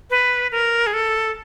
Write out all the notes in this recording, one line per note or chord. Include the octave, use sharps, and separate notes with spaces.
B4
A#4
G#4
A4